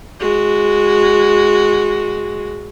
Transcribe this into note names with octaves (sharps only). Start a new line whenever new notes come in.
G#3 F#4